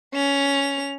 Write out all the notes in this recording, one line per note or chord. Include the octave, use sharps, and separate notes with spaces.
C#4 F7